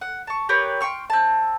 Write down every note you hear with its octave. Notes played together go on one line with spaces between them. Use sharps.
F#5
A5 C#6
G4 A#4 B4 C#5
G5 C6 C#6 F6
C4 A5